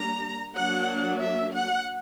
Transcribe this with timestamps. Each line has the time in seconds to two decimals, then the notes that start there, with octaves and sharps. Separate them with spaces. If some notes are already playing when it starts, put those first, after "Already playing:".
Already playing: G3 A#3 D4 A#5
0.55 F#3 A#3 D4 F#5
1.22 E5
1.54 F#5